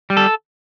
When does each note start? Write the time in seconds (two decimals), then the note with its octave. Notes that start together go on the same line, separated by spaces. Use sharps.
0.10 G3
0.17 A4